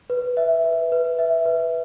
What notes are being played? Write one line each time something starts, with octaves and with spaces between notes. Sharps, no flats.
B4
E5
B4
B4
E5
B4